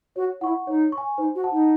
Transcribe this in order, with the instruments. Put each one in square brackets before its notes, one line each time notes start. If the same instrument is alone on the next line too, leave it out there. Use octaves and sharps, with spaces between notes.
[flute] F#4 [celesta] C#5
[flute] E4 [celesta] F#5 C#6
[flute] D#4 [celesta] C#5
[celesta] C#6
G#5
[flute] D#4 [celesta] C5
[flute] F#4
[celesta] F#5 A5
[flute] D#4